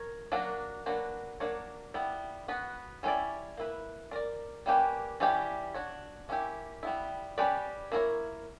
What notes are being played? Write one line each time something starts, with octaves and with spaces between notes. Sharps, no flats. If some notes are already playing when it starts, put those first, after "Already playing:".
Already playing: A#4 C#5
F#3 A#3 D4 F#4 A#4
F#3 A#3 D4 F#4 B4
F#3 A#3 D4 A#4 C#5
G3 B3 E4
B3 F#4 B4
G3 C#4 E4 B4 D5
A#3 E4 B4
D4 A#4 D5
G3 A#3 C#4 G4 B4
E3 G3 C#4 G4
D4 F#4 C#5
A#3 C#4 E4 G4
G3 B3 E4
G3 C#4 G4 B4 D5
A#3 E4 A#4 C#5